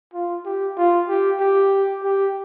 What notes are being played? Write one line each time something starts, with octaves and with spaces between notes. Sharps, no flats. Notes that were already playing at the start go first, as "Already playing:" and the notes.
F4
G4
F4
G4
G4
G4